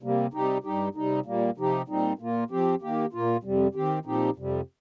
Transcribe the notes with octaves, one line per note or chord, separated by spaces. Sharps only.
C3 G3 A#3
C3 G3 D#4 G4
G2 G3 D#4 G4
C3 G3 D#4
A#2 G3 A#3
C3 F3 D#4 G4
A#2 G3 C4 D#4
A#2 A#3 F4
F3 C4 G4
D#3 A#3 G4
A#2 A#3 F4
F2 C3 G3
D#3 C4 G4
A#2 F3 C4 D#4 G4
F2 C3 G3